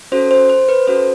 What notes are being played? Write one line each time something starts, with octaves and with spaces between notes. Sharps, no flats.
C#4 F#4 A4 C5
C5
C5
B4
C#4 F#4 A4 C5